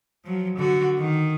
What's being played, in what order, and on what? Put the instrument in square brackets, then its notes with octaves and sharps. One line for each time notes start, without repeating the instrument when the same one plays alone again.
[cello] F3 F#3
D3 F#4
D#3